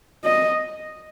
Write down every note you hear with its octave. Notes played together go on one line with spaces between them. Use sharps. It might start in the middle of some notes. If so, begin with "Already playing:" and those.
D#5